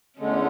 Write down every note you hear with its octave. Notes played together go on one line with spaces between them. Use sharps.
E2 D3 G#3 A3 C#4